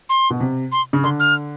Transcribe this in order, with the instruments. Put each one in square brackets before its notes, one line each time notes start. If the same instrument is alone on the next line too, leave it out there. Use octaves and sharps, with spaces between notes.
[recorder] C6
[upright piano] B2
C3
[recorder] C6
[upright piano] C#3
[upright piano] D3 [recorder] C6
[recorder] F6